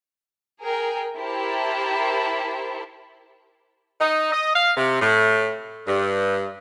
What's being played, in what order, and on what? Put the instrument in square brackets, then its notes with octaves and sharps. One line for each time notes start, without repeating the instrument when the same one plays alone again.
[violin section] G#4 A#4 G5
E4 G4 A#4 C5 A5
[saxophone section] D#4
D#5
F5
C3
A2
G2